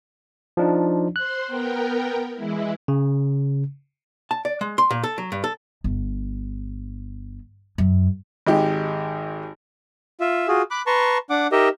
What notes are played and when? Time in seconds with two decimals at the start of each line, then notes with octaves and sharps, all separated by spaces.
0.57 F3 D4 D#4
1.16 C5 C6 F#6
1.47 B3 A#4 G5
2.34 E3 G#3 E4
2.88 C#3
4.31 A5
4.45 D5
4.61 G#3
4.78 C6
4.91 A#2
5.03 A4
5.18 F#3
5.32 G2
5.44 A4
5.84 G1
7.78 F#2
8.47 G#1 G#3 D#4 G4
10.20 F4 E5
10.48 F4 F#4 G#4
10.71 B5 D6 F#6
10.87 B4 A5 A#5 C6 C#6
11.30 D4 F#5 D6
11.52 D#4 G4 A#4 D#5 E5